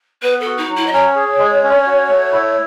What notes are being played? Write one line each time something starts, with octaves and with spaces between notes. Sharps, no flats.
B3 B4
A4
F#4
D#4
F#3
E4
D#5
C#4 C#5
G#4
G#3
C#4
F#4
A3
E4